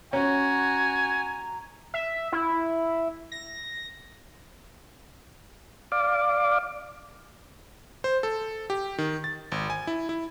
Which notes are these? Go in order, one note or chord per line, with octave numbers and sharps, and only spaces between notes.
C#4 F#4 G#5 A#5
E5
E4
A#6
D5 F5 D6
C5
A4
G4
D#3
A6
G#1
G#5
E4
E4